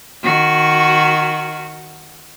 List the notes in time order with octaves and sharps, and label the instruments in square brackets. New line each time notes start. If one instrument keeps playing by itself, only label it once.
[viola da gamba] D#3 F#4